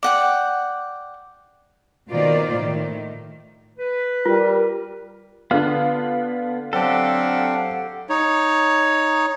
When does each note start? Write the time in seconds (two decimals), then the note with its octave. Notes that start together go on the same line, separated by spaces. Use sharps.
0.03 D5 F#5 G5
2.10 B2 D#3 A#3 F4 C5 D5
2.54 A2 D#3
3.78 B4
4.25 G3 F4 A#4
5.51 D3 B3 F4
6.73 F#3 C4 D4 G4 A4 F5 F#5
8.09 D#4 C#5